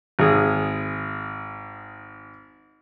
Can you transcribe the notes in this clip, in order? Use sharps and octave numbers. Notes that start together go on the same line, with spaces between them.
G#1 G#4